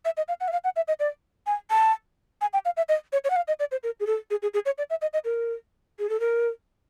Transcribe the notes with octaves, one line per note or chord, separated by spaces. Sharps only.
E5
D#5
F5
F#5
E5
F5
F#5
E5
D#5
D5
G#5
A5
G#5
G5
F5
E5
D#5
C#5
C#5
F#5
F5
D#5
D5
C5
A#4
G#4
A4
G#4
G#4
G#4
C#5
D5
E5
D#5
D#5
A#4
G#4
A4
A#4